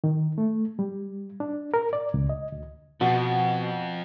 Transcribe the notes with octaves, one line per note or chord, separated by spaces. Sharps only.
D#3
A3
G3
D4
A#4
D5
C#2
D#5
D2
F2 B2